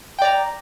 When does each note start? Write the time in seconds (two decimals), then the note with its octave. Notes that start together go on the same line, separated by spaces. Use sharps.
0.19 G5
0.22 D5
0.25 A#5